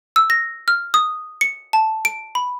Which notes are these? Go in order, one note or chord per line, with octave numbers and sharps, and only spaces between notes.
E6
A#6
F6
D#6
C#7
A5
D7
B5